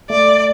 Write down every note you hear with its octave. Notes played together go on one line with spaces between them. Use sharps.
A3 D5